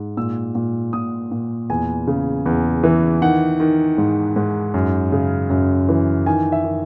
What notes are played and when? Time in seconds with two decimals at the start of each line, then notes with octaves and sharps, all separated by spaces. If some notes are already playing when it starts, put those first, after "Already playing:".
Already playing: G#2
0.17 A#2 E6
0.55 A#2
0.93 A#2 D#6
1.32 A#2
1.70 E2 G#5
2.07 C#3
2.46 E2
2.84 E3
3.22 D#3 F#5
3.60 D#3
3.98 G#2
4.36 G#2
4.74 F#2
5.12 C#3
5.50 F#2
5.89 E3
6.26 D#3 G#5
6.52 E5
6.64 D#3